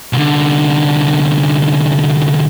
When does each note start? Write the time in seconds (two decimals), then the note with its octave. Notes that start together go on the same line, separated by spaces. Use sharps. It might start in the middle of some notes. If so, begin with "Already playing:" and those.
0.13 C2 D3